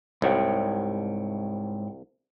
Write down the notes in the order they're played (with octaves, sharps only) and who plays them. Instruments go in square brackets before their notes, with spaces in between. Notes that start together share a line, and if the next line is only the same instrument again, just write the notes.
[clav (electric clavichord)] C2 [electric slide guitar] G#2 C#5 G5